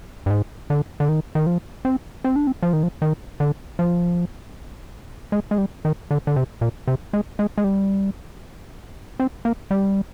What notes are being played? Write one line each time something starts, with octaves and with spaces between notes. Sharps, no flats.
G2
G#2
D3
D3
D#3
D#3
F3
C4
C4
D4
C4
F3
D#3
F3
D#3
D3
F3
G#3
G#3
G3
D#3
D3
D3
C3
A#2
C3
G#3
G#3
G#3
G3
C4
A#3
G3